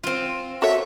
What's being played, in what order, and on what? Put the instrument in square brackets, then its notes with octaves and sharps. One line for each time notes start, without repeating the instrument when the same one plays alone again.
[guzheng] C4 F4
[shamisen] F#4 A4 C#5 [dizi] E5